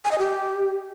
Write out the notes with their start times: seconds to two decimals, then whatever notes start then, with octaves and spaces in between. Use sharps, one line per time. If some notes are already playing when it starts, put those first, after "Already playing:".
0.05 G#5
0.12 D#5
0.19 G4